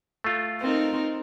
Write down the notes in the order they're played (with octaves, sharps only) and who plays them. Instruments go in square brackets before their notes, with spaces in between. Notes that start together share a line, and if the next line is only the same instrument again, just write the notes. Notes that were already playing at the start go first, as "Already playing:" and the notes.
[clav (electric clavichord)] A3 F4
[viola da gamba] C4 D#4 A#4